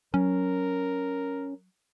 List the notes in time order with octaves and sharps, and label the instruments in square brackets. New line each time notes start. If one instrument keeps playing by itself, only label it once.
[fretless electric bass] F#3 [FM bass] C#4 [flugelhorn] A#4